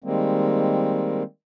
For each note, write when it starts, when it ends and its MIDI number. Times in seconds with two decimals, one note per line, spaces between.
0.04 1.23 51
0.04 1.23 55
0.04 1.23 56
0.04 1.23 58
0.04 1.23 60